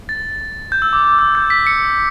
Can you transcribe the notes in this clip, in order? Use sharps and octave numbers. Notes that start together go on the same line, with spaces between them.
A6
G6
E6
D6
D6
E6
G6
B6
C#7